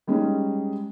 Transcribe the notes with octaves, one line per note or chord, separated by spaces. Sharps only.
G3 G#3 C#4 D#4